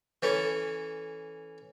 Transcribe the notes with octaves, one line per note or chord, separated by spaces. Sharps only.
E3 C#4 A4